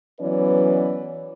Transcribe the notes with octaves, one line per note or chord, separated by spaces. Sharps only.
E3 F#3 B3 C#4 B4 D5